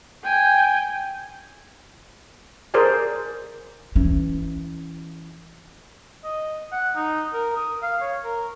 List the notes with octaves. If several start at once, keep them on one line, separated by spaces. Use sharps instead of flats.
G5 G#5 G6
G#4 A#4 C5 D5 G#5
E3 C#4
D#5
F#5
D#4
A#4
D#6
F5
C#5
A#4